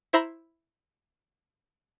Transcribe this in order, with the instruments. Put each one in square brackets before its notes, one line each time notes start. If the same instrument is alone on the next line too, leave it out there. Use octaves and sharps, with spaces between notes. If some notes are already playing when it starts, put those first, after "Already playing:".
[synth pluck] E4 C5 E5 A#5 B5